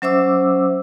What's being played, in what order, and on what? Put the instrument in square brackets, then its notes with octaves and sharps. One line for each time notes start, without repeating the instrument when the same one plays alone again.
[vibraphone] F#3 C#4 C5 E5 D6 E6